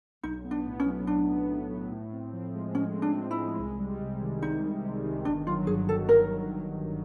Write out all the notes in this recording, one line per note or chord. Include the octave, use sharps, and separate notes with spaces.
B1 D#4
B3
D4
A2
C#4
F#3
B1 D4
B3
A2
F#3
A2
C4
F3
G#3
A2 C#4
C4
D4
F3
E4
G#3
C2
G3
C3
D#3
C2 D#4
G3
C3
D#3
G1 D4
F#3 F4
G2 G#4
D#3 A4
G1 A#4
F#3
G2
D#3